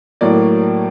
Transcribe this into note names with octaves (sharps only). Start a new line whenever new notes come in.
A2 F#3 A#3 D5